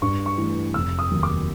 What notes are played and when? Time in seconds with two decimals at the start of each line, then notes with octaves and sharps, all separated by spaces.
0.02 G2 C#6
0.26 C#6
0.37 E3 A3
0.74 F1 E6
0.99 D#6
1.11 D#2 D#3 F#3
1.23 D6